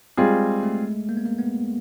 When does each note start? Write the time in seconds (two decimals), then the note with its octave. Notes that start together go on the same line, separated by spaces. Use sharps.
0.17 G3 G#3 C4 F4 G#4
0.63 A3
1.09 A#3
1.17 B3
1.25 A#3
1.39 B3